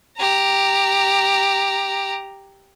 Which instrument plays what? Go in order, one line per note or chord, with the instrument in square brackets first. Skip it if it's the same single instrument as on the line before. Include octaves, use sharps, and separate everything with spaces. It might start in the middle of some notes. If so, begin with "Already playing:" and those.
[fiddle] G4 A#5